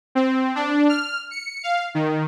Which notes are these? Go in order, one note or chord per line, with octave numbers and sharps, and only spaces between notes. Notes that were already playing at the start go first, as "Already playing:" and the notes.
C4
D4
F6
C#7
F5
D#3